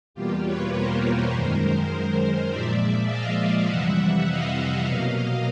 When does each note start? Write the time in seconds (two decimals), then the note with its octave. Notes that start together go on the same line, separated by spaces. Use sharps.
0.14 E2 B2 G3 A#3 F4 G4
0.44 B4 C#5
0.73 A#4 C5
1.32 F#2 D#3 G#3
2.50 A#2 F3 G#3 D5 E5
3.09 D#5 F5
3.68 F2 C3 E3 G3 E5 F#5
4.26 D#5 F5
4.85 B2 F#3 A#3 D#5 F5